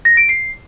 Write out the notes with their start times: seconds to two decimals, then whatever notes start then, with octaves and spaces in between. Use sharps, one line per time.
0.05 A#6
0.17 D7
0.29 C7